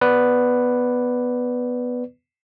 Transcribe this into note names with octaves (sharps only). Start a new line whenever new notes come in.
B3 B4 D5